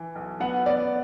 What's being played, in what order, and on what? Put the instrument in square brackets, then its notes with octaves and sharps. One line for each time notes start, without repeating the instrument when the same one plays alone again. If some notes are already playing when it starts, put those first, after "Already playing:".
Already playing: [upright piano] E3
B1
[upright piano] B3 [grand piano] F#5
[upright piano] B3 [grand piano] D5